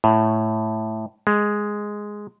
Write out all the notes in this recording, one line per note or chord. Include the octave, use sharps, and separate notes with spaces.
A2
G#3